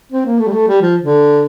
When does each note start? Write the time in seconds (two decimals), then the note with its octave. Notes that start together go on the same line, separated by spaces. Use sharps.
0.12 C4
0.25 A#3
0.39 A3
0.47 G3
0.53 A3
0.67 G3
0.81 F3
1.01 D3